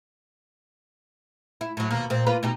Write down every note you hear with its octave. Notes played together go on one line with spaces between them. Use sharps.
E4
A2 F#3
D#2 B2 A#3
A#2 C4
A#3 F4 B4
B2 D#4 G4